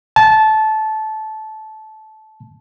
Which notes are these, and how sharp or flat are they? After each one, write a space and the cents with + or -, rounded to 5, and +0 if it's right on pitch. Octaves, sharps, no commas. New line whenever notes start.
A5 -15